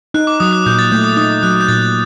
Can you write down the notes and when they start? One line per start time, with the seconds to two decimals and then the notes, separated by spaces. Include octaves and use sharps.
0.14 D#4 F#6
0.27 D6
0.40 F#3 D#6
0.53 F#6
0.66 A#2 G6
0.79 A6
0.92 A3 G6
1.04 D#6
1.17 D#4 D#6
1.43 F#3 F#6
1.61 G6
1.68 A#2 A6